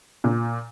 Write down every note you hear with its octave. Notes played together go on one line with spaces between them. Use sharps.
A#2